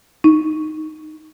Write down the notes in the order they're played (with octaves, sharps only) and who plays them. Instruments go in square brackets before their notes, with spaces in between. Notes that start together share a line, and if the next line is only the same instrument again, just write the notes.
[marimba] D#4